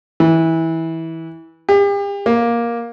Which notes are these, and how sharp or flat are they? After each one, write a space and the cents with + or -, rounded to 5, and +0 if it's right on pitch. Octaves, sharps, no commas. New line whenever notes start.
E3 -20
G4 +40
A#3 +10